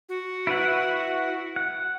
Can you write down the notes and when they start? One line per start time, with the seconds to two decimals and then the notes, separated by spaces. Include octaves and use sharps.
0.09 F#4
0.47 E4 B4 F#5
1.56 F#5